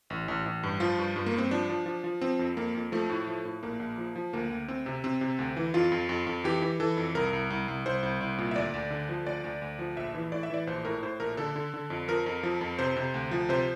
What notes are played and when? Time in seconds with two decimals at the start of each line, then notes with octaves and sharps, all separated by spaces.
0.10 A1
0.28 A1
0.46 A1
0.63 G2
0.80 F3 F4
0.99 G2
1.16 G2
1.26 A#3
1.34 G2 C4
1.51 F3 D4
1.69 F3
1.86 F3
2.04 F3
2.21 F3 C4
2.39 F2
2.57 F2 A#3
2.75 F2
2.92 F3 A3
3.10 A2
3.27 F3
3.45 A2
3.63 A#1 A#3
3.80 A#1
3.98 F3
4.16 F3
4.33 D2 A#3
4.50 D2
4.68 D2 C4
4.86 C3
5.04 C3 C4
5.21 C3
5.39 D2
5.57 E3
5.74 F2 F4
5.92 F2
6.09 F2
6.27 F2
6.44 E3 G4
6.62 E3
6.80 E3 A4
6.97 F2
7.15 C2 A#4
7.33 C2
7.50 C2
7.68 C2
7.86 C2 C5
8.03 C2
8.21 C2
8.39 A#2
8.51 E5
8.56 D2 D5
8.74 D2
8.91 D3
9.09 F3
9.26 D2 D5
9.44 D2
9.62 D2
9.79 F3
9.97 A#1 E5
10.14 E3
10.32 A2 D5
10.43 E5
10.50 E3 D5
10.67 A#1 C5
10.85 A2 A#4
11.03 A2 C5
11.20 A#1 A#4
11.37 D3 A4
11.56 D3
11.74 D3
11.90 F2
12.08 F3 A#4
12.26 F2
12.43 F3
12.61 F2
12.79 C3 C5
12.96 C3
13.14 D2
13.31 F3
13.49 C3 C5